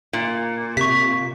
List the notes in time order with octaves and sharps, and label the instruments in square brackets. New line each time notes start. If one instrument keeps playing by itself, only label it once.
[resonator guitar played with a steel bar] A#2
[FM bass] C3 [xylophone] C#6 B6